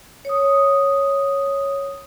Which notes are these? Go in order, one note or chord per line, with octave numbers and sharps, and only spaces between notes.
C#5 D#6